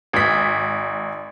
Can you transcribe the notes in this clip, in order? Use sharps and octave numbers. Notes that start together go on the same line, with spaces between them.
G#1 B6